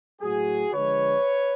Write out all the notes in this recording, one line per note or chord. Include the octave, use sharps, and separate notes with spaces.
A2 F#3 F#4 G#4
D3 F3 G#3 B4 C#5